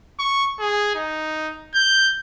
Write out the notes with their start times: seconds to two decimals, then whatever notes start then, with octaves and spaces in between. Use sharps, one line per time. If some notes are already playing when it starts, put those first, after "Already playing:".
0.20 C#6
0.60 G#4
0.95 D#4
1.75 G6